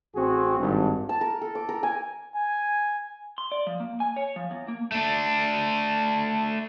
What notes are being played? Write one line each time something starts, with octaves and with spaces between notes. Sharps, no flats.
A1 C4 F#4 G#4
G#1 G2
A5
A#4
A4
D6
A#4
G#5
G#5
C6
D5
F3
A#3
G#5
C#5
F3
E2
A#3
A3 D4